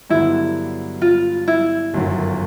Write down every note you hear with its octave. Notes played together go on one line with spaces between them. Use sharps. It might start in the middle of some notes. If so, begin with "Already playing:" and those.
G2 D3 F#3 B3 E4
F4
E4
G1 F#2 D#3 F#3